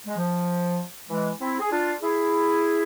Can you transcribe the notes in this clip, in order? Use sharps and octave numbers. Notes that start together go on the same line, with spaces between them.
G#3
F3
E3 G#3
C4 E4
G#4
D4 F4
E4 G#4